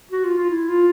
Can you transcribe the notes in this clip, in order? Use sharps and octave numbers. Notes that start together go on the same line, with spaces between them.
F#4
F4
F4
E4
F4